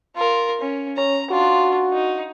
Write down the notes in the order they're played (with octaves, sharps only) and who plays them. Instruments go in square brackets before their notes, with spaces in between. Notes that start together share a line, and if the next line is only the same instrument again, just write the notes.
[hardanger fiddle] F4 A#4
C#4
[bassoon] C#4 [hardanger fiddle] A#5
[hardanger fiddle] D4 F4 [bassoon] F#4
[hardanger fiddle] D#4